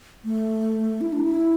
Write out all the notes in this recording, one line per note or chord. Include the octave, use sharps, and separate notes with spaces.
A3
E4
D4
E4